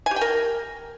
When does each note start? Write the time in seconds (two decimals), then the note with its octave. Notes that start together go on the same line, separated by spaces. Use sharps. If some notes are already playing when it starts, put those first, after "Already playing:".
0.06 G#5
0.11 G4
0.16 G5
0.21 A#4